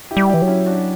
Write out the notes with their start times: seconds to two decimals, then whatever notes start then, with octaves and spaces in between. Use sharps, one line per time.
0.11 E4 G4
0.17 G3
0.29 E4 G4
0.34 E3
0.42 F#3
0.48 C#4 E4
0.66 D4 F#4